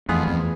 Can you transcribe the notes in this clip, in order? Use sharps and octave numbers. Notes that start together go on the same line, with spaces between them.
F2 A2 E3 B3 F4 G#4
F2